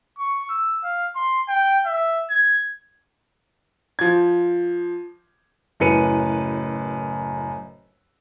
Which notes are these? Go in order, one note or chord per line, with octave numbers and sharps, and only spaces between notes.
C#6
E6
F5
C6
G5
E5
G#6
F3 G#6
F#1 F#2 A2 B4 C#7 D#7